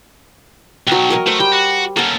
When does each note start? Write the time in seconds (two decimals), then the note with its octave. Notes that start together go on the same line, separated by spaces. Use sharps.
0.87 B1 F#3 G5
1.10 A#4 C#5 D#5
1.27 A3 C5
1.40 G3 G5
1.52 F#4
1.97 A#3 C#4 A4 F#5